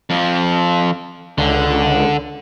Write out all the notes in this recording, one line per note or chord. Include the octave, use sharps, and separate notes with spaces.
F2 F3
C#2 D3